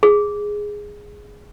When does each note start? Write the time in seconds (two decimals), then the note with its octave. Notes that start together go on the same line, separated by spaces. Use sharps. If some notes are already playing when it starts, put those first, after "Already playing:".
0.03 G#4